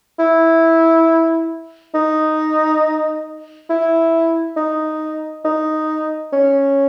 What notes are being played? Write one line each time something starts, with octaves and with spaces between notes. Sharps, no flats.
E4
D#4
E4
D#4
D#4
C#4